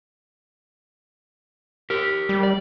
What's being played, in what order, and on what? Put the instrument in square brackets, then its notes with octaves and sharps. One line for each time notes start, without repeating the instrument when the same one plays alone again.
[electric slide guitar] G4 A#4
[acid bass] G3
[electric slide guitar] D5